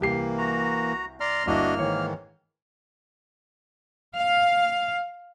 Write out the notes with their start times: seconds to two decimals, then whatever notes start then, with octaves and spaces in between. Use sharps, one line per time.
0.01 C2 E3 A#3 G4 C7
0.38 F#4 A#5
1.20 D5 A#5 C6 F6
1.47 G1 A#3 D4 E4 F#4 D#5 E5 F6
1.79 G#2 D#3 E3 C#5
4.15 F5